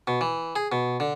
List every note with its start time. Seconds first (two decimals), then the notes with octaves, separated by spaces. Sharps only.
0.07 B2
0.21 E3
0.56 G#4
0.72 B2
1.00 D3